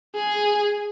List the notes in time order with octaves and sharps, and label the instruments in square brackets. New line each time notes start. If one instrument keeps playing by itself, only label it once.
[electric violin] G#4